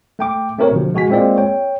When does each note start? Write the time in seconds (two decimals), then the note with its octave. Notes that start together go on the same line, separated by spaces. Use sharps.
0.19 A3 G5 D6
0.59 A3 C4 G4 A#4 C#5
0.72 B2 D3 F3
0.94 G#3 F#4 G#5 B6
1.10 G#3 A#3 C4 F4 D5
1.36 C#5 G5